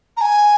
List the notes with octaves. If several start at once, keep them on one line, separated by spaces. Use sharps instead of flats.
A#5
G#5